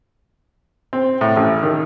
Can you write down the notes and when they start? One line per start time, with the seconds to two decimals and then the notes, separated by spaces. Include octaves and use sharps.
0.93 C4
1.21 A2
1.36 A1
1.63 D#3